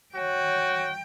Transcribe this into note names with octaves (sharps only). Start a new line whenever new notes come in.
F#4 C#5 G5